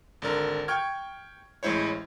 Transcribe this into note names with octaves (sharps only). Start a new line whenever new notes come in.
G#1 D3 A#4
G5 C#6 F6 G#6
A1 G#3 E4 C5 C#5